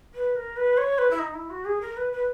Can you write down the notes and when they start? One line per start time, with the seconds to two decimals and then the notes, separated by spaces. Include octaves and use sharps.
0.14 B4
0.35 A#4
0.56 B4
0.77 C#5
0.98 B4
1.10 E4
1.19 D#4
1.34 E4
1.49 F#4
1.65 G#4
1.81 A#4
1.96 B4
2.12 B4